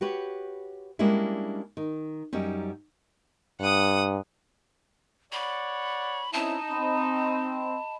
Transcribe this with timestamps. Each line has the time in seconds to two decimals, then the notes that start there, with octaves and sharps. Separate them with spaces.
0.01 F#4 G4 B4 C#5
0.99 G3 G#3 A#3 C#4 D4 E4
1.77 D#3
2.33 F#2 G3 C#4 D#4
3.61 G2 F#5 D#6
5.32 C#5 D5 F#5 B5
6.33 C4 C#4 D#4 E4 A5
6.71 C4 D#5 B5